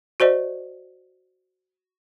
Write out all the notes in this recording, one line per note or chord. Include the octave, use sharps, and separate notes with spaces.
F#4 C5 D5 D#5